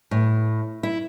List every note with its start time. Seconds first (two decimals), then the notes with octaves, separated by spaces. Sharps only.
0.11 A2
0.83 E4